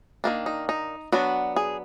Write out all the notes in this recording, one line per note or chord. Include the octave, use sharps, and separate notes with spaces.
D#3 A#3 D4
D#4
D#4
F#3 B3 D4 F#4
G#4